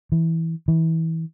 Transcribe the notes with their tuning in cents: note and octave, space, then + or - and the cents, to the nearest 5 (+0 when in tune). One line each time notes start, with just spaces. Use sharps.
E3 -10
E3 -25